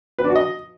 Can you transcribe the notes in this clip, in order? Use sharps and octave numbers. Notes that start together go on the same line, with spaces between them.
B4
D4
F#4
D#5